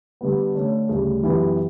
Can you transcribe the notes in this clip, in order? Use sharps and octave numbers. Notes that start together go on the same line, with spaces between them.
D3 G3 B3
D3 A3 C#4
D2 C#3 G3
F#2 E3 B3 E4 G4